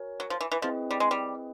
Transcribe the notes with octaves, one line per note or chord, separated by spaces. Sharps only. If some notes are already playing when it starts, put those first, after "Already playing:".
Already playing: F#4 A#4 C#5 G#5
F#3
F3
E3
E3
F3 C4 E4 G#4 B4 D#5
G3
G#3
G3